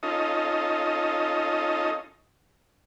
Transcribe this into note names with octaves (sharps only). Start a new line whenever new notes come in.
C#4 D#4 F4 A4 D#5